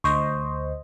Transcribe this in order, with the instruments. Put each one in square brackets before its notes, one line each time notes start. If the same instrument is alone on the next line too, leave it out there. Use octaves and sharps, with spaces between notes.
[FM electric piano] D2 C5 D#5 [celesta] C#6